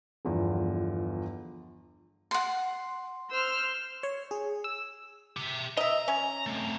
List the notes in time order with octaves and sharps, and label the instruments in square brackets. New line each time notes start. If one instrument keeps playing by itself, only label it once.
[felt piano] G1 E2 F3
[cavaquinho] F#5 C6
[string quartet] C5 E6 F6
[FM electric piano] C#5
G#4
E6
[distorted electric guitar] G4 E5
[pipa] D#5 E5 [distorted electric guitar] A#5
[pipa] C#4
[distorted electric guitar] A3 C4